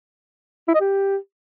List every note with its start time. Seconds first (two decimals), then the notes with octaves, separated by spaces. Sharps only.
0.68 E4
0.74 D#5
0.80 G4